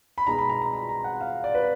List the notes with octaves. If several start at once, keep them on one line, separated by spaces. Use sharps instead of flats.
B5
B2 G#3 D#4 A#5
B5
A#5
A#5
B5
A#5
F#5
F5
D5
B4